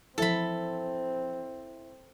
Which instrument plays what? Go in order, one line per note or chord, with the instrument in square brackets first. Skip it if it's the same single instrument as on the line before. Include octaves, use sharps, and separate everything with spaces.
[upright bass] E3 F3 [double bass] C4 [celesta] E4 E5 [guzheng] A4 B5